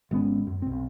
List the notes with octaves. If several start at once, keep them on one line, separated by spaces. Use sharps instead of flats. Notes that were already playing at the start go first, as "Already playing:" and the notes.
G#1 G#3 B3 C#4
F#2
B1 C4